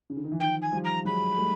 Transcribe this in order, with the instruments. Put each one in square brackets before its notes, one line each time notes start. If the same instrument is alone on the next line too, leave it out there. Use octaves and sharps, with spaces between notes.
[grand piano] C#3
D3
D#3
E3
[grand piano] D#3 F3 [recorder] G5
[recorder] G#5
[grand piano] F3 G3
[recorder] A#5
[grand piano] F#3 G#3 [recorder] B5
[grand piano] G3 A3